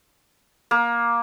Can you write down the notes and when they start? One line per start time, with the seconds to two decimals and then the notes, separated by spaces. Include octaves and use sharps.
0.71 A#3